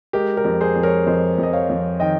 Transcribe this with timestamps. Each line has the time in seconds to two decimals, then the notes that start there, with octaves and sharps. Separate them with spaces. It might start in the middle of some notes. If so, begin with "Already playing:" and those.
0.13 G#3 G4 A#4
0.37 G4 A#4
0.45 F2
0.61 G#4 C5
0.75 F2
0.83 A#4 C#5
1.06 F2 C5 D#5
1.38 F2
1.43 D#5
1.53 C#5 F5
1.69 F2
2.00 D#3 D#5 G5